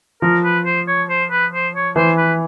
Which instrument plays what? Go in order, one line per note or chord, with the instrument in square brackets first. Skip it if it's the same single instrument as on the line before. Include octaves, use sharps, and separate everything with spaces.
[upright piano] F3 [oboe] A#4
[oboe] B4
C5
C#5
C5
B4
C5
C#5
[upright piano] E3 [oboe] C5
[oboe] B4